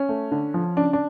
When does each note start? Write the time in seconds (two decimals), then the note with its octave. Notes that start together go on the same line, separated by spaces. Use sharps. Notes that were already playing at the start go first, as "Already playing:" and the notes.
Already playing: C#4
0.09 A3
0.32 D3
0.54 F3
0.76 C#3 D4
0.93 D4